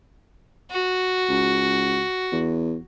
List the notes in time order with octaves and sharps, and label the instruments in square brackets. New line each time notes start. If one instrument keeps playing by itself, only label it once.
[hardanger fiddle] F#4
[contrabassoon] C#2
E2